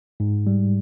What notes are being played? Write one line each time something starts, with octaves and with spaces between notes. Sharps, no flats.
G#2
G3